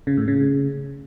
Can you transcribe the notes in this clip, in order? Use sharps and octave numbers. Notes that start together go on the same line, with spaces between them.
C#3
A2
C#3